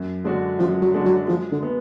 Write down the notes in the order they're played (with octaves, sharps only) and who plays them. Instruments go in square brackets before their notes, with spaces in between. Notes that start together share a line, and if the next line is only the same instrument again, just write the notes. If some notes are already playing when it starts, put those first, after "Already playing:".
Already playing: [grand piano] F#2
D3 G#3 D4 F#4
[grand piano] F#2 [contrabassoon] F3
[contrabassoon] F#3
[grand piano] D3 G#3 D4 F#4
[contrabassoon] F#3
[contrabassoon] F3 [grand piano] G#3
[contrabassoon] D3
[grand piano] B3